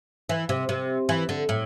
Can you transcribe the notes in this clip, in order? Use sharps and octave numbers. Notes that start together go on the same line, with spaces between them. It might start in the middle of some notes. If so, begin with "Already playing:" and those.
E3
C3
C3
E3
D3
A2